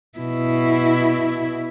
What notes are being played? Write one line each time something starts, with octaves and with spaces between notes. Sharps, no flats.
B2 E4